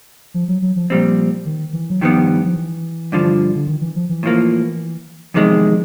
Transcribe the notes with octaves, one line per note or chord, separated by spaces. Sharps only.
F3
F#3
F#3
F3
A#2 F3 G3 C4
D#3
E3
F#3
G2 D#3 F3 G3 B3
F3
E3
G2 D3 F3
D3
D#3
E3
F3
E3
A2 F3 A#3
E2 C3 D#3 F3 G#3